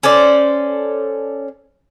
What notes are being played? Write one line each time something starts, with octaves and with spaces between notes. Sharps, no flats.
C#4 A4 C5 D5